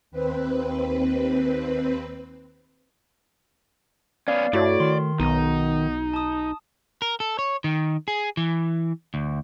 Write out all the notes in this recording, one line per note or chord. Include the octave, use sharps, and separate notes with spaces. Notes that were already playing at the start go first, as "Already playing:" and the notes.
D#2 C4 B4
B3 C#4 D5 F5
G2 A3 E4 F#4 C#5 D5
D#3 C6
B1 B3 D#4
A5 D#6
A#4
A4
C#5
D#3
G#4
E3
D2